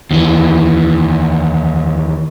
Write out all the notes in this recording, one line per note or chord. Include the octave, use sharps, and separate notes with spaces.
D#2 E3